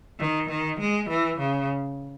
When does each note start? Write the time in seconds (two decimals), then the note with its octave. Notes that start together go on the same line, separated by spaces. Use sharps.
0.20 D#3
0.50 D#3
0.80 G#3
1.10 E3
1.39 C#3